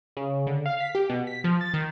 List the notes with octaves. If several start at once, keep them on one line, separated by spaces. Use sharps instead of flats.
C#3
D3
F5
B6
G4
B2
B6
F3
A6
D#3